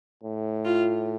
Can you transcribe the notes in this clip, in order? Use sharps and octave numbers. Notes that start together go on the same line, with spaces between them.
A2
F4